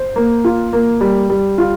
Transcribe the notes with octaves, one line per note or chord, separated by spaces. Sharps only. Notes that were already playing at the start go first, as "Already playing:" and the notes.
Already playing: C5
A#3
F4
A#3
G3
G3
F4